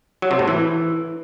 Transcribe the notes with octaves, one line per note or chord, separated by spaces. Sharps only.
F#3
C3
A2
E3